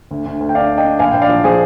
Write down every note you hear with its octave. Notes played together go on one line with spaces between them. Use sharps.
D2
D2
D2
G5
D4 D5 F5
D4
D#5 G5
D4
A#1 F5 G#5
A#1 G5
D5 F5
F3
F3 G#4 C5